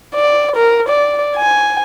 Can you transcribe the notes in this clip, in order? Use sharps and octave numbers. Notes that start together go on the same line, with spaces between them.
D5
A#4
D5
G#5